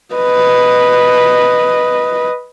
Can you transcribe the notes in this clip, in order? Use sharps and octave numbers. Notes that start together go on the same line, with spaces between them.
B4 D#5